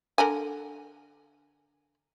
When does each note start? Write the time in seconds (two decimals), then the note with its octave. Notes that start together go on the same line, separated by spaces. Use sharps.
0.18 D3 A#4 G#5